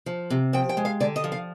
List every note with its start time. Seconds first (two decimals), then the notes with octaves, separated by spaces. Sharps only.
0.06 F3
0.30 C3
0.53 F3 G5
0.69 G5
0.77 G#3
0.85 F5
1.00 D3 D5
1.16 D#5
1.24 F3
1.32 F5